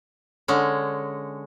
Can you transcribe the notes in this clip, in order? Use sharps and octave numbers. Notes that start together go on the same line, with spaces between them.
D3 G#3 C#4